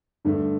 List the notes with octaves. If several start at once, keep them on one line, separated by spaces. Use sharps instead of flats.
G2 D3 A3